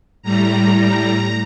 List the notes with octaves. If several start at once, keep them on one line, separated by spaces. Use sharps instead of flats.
A2 G3 A#5
A#5